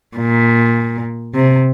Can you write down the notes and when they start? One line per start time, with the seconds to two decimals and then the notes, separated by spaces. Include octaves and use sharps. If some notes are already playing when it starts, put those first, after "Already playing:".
0.17 A#2
1.35 C3